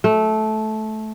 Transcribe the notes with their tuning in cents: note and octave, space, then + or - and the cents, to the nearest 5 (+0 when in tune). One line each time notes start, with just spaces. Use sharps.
A3 -15